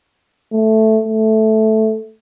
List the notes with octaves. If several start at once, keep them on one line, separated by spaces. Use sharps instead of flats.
A3
A3